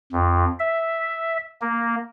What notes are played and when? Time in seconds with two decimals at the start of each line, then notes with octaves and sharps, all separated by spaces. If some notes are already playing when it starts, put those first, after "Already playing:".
0.12 F2
0.59 E5
1.61 A#3